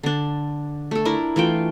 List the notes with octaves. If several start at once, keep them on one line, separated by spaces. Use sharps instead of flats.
D3 D4
A3 A4
D4 E4 A#4
E3 A3 F4 G5